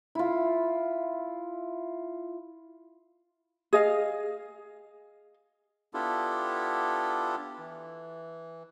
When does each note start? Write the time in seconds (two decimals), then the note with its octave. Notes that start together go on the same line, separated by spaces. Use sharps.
0.15 E4 F4
3.73 G#4 D#5 F5
5.94 B3 D4 E4 F4 G4 A4
7.59 E3